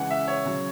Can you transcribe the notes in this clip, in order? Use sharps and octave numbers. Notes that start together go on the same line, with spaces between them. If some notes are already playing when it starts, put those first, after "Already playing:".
Already playing: C#3 E3 G#3 F#5
E5
C#5
C#3 F#3